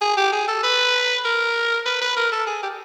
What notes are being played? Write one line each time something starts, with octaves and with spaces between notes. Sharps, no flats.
G#4
G4
G#4
A4
B4
A#4
B4
B4
A#4
A4
G#4
G4